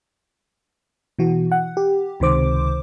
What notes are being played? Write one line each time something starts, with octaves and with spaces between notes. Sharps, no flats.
B2 E3 F#4
F#5
G4
C#2 C3 D#3 C5 D6